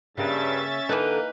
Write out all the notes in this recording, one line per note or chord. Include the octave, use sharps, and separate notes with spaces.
G2 C#3 A#3 C#4 E5 A6
D3 E3 A#3 D#4 A4 B4